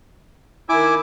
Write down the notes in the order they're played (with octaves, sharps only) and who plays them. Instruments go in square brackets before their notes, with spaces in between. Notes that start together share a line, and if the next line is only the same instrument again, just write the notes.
[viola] D#3 E5 [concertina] E4 G#5 D6